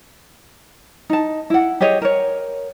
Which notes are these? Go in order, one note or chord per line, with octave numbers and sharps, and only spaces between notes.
D#4 A5
E4 F#5
G4 G#4 C#5 D#5
A#4 C#5